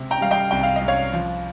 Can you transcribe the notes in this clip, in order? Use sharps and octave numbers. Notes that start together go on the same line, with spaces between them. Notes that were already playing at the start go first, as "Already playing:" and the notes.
Already playing: C3 G#3
G5 A#5
G3 F5
D#5 G5
C2 G5
F5
D#5
C2
C#5 F5
F3